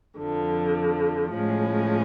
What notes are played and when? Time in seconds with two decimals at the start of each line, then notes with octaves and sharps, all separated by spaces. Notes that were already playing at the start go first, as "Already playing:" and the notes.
0.17 F2 D3 F3
1.33 A2 F3 G#3 C#4